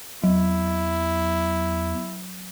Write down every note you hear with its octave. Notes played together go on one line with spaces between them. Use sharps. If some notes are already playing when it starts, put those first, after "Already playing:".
E2 F#3 E4